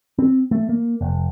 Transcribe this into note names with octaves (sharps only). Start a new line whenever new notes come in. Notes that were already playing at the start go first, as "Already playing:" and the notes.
C4
A3
A#3
F1